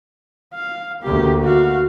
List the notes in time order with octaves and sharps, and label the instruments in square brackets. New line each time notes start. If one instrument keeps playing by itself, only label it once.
[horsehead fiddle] F5
[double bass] D2 A#3 [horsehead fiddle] G4
[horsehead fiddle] F#4 F5